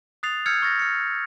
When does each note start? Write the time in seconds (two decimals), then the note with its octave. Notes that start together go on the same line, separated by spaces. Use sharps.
0.23 D#6 F#6 A6 C7 F7
0.46 E6 F6 G6 G#6 C#7
0.62 C#6 F6 A6 A#6
0.79 F6 C#7